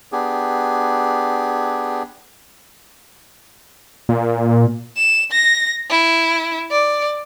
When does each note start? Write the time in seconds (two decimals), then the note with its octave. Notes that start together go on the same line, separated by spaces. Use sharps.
0.12 B3 D4 G4 G#4
4.09 A#2
4.97 E7
5.31 A#6
5.90 E4
6.71 D5